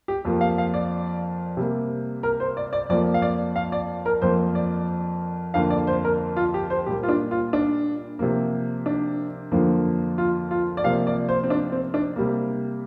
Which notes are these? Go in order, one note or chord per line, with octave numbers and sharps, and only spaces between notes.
G4
F2 F3 A#3
F5
F5
D5
C3 G3 A#3
A#4
C5
D5
D5
F2 F3 A#3 D5
F5
D5
F5
D5
A#4
F2 F3 A#3 C5
D5
F2 D3 A#3 F5
D5
C5
A#4
F4
G4
C5
A#2 G3 A#3 G4
F4
D4
F4
D4
C3 F3 A#3
D4
F2 D3 F3 A#3
F4
F4
D5
C3 F3 A#3 F5
D5
C5
C4
D4
C4
D4
C3 G3 A#3